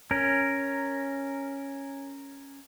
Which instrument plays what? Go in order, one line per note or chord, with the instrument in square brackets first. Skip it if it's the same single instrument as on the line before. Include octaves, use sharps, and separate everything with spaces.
[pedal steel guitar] C#4 A#4